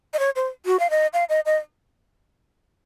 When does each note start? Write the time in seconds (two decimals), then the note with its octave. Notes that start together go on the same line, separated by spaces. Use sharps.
0.13 D#5
0.19 C#5
0.36 C5
0.66 F#4
0.79 F5
0.90 D#5
1.13 F5
1.29 D#5
1.46 D#5